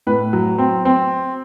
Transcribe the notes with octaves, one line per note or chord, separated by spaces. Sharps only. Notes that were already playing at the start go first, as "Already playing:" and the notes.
A2 B4
F#3
C4
C4